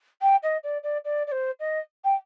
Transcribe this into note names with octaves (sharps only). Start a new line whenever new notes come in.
G5
D#5
D5
D5
D5
D5
C5
D#5
G5